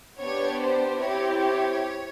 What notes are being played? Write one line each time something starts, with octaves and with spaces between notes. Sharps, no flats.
B3 D4 G4 C#5
C5
C4 E4 G4 C#5
C#5